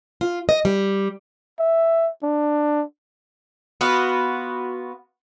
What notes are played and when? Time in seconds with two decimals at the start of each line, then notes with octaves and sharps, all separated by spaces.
0.21 F4
0.49 D#5
0.65 G3
1.59 E5
2.23 D4
3.81 B3 F4 F#4